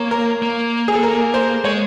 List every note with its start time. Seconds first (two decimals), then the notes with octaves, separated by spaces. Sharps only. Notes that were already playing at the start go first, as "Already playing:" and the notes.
Already playing: A#3 A#4 C#5
0.11 A#4
0.42 A#3
0.88 G#4
0.95 A4
1.03 A#4
1.34 C5
1.65 G#3 C#5